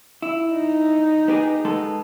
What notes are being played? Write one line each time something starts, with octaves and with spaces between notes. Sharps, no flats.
E4
D#4
B3 G4 G#4
G#3 B3 A4